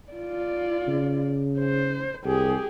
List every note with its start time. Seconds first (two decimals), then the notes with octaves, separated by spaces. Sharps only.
0.12 F4 D5
0.88 C#3
1.60 C5
2.25 C2 G4 G#4